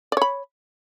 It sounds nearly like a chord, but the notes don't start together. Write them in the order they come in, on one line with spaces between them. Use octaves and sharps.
D5 C#5 B5